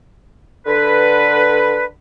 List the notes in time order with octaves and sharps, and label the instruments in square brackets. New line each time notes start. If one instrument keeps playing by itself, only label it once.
[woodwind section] D3 B4